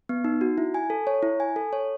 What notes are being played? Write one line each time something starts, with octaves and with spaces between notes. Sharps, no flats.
B3
D#4
F#4
E4
G#5
A4
C#5
E4
G#5
A4
C#5